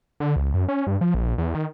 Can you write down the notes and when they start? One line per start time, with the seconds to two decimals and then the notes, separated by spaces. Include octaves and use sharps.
0.20 D3
0.36 C#2
0.54 F#2
0.68 C#4
0.87 G2
1.01 F3
1.14 A#1
1.38 E2
1.55 D#3